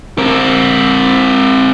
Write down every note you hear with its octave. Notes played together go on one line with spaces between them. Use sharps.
C4 A#4